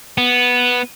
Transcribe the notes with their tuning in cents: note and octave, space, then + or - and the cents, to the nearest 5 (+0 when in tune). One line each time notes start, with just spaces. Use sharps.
B3 -5